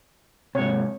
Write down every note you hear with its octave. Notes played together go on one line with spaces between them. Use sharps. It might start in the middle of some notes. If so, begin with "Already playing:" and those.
G#2 C3 C#5